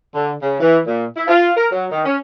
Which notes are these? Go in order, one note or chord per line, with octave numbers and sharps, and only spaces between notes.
D3
C#3
E3
A#2
E4
F4
A#4
F#3
D#3
C#4